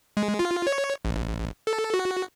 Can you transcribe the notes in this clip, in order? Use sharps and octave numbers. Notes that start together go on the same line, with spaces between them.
G#3
F4
C#5
A1
A4
F#4